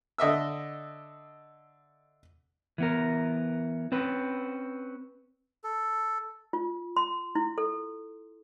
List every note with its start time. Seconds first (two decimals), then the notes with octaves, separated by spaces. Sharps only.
0.18 D3 D#5 E5 E6
2.78 E3 B3 A#4
3.92 C4 C#4 B4
5.64 A4
6.53 F4
6.97 C6
7.35 E4
7.58 A4